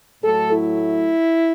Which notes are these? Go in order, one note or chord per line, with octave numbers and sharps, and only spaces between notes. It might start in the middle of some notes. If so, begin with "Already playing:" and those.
A2 F#3 A3 A4
E4